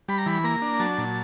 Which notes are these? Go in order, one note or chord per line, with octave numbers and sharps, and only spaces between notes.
G3 B5
A#5
E3 B5
A#3 A#5
D4
F#3 A5
A#2